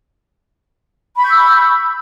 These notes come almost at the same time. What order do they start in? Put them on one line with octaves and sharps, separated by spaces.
B5 C#6 G6 E6